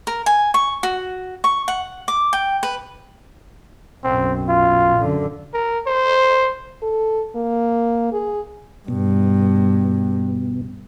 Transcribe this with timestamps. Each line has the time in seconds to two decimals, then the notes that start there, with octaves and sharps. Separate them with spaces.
0.07 A#4
0.26 G#5
0.54 C#6
0.83 F#4
1.44 C#6
1.68 F#5
2.08 D6
2.33 G5
2.63 B4
4.03 B1 F#2 C4
4.49 F4
4.98 F#2 D3
5.53 A#4
5.87 C5
6.82 A4
7.35 A#3
8.12 G#4
8.88 G2 B2